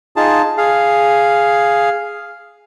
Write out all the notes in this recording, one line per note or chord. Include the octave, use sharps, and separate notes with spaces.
D#4 F4 G#4 A5
G#4 F5